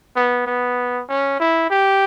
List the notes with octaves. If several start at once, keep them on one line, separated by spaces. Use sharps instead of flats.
B3
B3
C#4
E4
G4